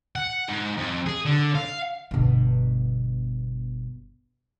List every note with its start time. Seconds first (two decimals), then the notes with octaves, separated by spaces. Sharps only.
0.16 F#5
0.48 G#2
0.77 F2
1.06 G#4
1.25 D3
1.55 F5
2.11 G1 B2